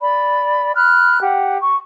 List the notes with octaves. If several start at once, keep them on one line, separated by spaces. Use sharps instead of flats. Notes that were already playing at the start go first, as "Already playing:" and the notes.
D5 B5
B5 F6 F#6
G4 F#5
C#6